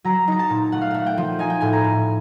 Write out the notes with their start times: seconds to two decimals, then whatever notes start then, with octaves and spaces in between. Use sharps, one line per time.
0.04 F#3 A#5
0.28 D#4 A#5
0.39 A5
0.50 A#2
0.72 A3 F#5
0.81 F5
0.91 A3 F#5
1.06 G5
1.18 F3
1.39 D#4 G#5
1.50 G5
1.60 A2 G#5
1.73 A#5
1.84 A2